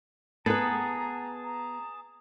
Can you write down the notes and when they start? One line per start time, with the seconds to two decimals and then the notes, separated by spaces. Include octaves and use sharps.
0.46 B3 G#4 B4 A5 A#5
1.44 A#5